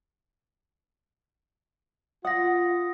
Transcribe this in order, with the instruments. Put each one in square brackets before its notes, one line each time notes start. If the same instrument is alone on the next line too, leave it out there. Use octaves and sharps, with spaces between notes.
[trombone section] F4 [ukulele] F#5 [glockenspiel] D#6 A#6